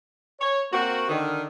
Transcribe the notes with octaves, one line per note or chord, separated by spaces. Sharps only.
C#5
A#3 C4 F#4
D3 D#3